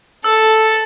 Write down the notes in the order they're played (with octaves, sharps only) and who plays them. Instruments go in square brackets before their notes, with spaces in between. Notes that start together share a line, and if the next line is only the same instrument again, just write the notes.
[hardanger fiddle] A4 [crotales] E6